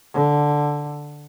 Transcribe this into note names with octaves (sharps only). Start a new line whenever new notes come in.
D3